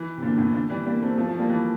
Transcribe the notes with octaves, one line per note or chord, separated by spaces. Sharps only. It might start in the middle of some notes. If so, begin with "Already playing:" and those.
Already playing: E3
C3
A#2 D3
A2 C3
A#2 D3
E3 G3
G3 A#3
A3 C4
F3 A3
F3 A3
G3 A#3
E3 G3